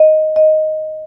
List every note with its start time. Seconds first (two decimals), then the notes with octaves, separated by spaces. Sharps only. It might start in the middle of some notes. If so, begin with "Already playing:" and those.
Already playing: D#5
0.36 D#5